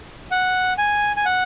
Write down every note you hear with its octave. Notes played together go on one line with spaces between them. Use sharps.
F#5
G#5
G#5
F#5